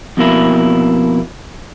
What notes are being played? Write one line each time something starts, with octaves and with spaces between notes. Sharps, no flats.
F2 B2 A#3 E4